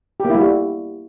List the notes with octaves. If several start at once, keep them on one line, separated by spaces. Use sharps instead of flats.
G4
A#3
E4
G3
F#4